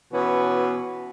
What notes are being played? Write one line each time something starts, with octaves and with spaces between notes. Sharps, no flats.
B2 E3 B3 C#4